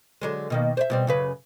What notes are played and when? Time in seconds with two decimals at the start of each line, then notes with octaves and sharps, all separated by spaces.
0.21 D3 F#3 G#3
0.50 B2 D#3 A#3
0.77 C5 D5 E5
0.90 B2 G3 C4
1.07 F#2 C#3 B4